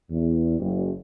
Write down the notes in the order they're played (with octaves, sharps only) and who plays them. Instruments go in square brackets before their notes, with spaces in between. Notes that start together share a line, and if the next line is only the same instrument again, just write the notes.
[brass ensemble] E2
F#1